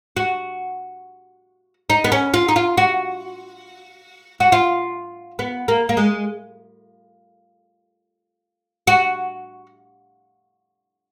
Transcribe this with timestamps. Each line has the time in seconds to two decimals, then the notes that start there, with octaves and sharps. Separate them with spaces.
0.17 F#4
1.90 D#4
2.04 B3
2.12 C#4
2.34 F4
2.49 D#4
2.56 F4
2.77 F#4
4.40 F#4
4.52 F4
5.39 B3
5.68 A#3
5.89 A#3
5.97 G#3
8.87 F#4